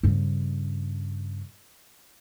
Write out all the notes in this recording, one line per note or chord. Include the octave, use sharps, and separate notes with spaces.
G2 C#3